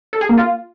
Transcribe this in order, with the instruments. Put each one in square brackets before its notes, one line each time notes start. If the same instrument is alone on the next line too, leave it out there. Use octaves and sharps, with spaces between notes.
[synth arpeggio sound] A4
G#4
A#3
F4